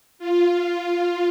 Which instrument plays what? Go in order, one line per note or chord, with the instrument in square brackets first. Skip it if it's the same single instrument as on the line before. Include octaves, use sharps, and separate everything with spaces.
[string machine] F4